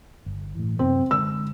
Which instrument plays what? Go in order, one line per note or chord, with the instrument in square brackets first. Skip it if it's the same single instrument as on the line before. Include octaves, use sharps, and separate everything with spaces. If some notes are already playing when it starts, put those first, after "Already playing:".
[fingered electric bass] G1
A2 E3
[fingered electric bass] F#2 C3 [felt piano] C4
[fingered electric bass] D3 G#3 [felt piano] E6